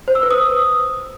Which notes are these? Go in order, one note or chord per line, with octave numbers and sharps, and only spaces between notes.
C5
E6
B4
D#6